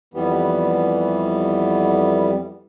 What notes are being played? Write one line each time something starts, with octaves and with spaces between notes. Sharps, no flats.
F2 E3 G3 B3